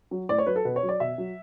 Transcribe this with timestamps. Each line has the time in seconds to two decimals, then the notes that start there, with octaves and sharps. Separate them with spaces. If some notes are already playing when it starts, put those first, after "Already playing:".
0.11 F#3
0.29 A2 D5
0.38 C#5
0.46 F#3 B4
0.56 A4
0.65 B2 B4
0.76 C#5
0.83 F#3
0.89 D5
1.00 B2 E5
1.18 F#3